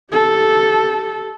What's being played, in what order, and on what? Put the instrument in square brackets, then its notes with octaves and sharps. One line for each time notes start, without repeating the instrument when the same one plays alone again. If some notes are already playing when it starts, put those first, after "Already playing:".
[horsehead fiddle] G4 A4